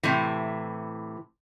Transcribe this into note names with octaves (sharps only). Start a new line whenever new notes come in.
A2 C3 E3